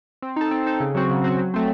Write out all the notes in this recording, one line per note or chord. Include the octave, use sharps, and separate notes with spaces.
C4
D#4 A4
C4
D#4 A4
C#3
F#3 C4 F#4
C#3
F#3 C4 F#4
F#3
A3 C4